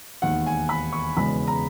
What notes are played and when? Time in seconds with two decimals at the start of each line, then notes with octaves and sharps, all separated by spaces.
0.22 E1 D#2 D#3 F#5
0.47 G#5
0.69 B5
0.93 C#6
1.17 E1 E2 C#3 G#3 B3 B5
1.47 A#5